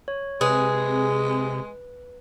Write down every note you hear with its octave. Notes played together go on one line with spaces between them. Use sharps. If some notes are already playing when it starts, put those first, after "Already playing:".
C#5
C3 G#3 G#4 B4